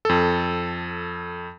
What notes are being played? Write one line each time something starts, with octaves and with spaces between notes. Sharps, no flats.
F2 A4